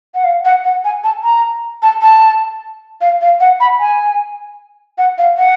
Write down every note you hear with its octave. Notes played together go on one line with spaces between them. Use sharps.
F#5
F5
F#5
F#5
G#5
A5
A#5
A5
A5
F5
F5
F#5
B5
G#5
F#5
F5
F#5